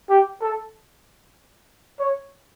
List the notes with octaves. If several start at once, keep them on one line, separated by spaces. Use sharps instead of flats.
G4
A4
C#5